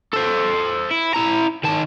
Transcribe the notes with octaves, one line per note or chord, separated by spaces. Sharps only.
A4 C5
E4
E4 A#5
D#3 A5